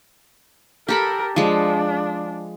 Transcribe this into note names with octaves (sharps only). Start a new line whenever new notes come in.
G4 A4 A#4 B5
F3 G#3 D4